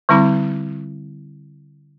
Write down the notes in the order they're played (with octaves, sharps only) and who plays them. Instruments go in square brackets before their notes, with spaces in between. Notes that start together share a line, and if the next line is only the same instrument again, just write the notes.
[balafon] D3 G3 C4 E4 B5